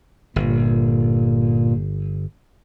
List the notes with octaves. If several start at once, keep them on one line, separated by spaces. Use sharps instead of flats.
G1 A#2